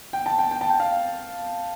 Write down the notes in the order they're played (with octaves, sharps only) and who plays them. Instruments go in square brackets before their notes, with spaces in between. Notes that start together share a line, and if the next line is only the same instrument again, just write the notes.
[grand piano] G5
A5
G5
G5
A5
G5
F5